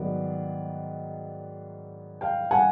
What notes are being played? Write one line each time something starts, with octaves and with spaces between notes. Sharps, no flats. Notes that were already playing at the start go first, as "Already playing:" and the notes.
Already playing: G#2 D#3 F#3 B3 D5
F5 G5
F#5 G#5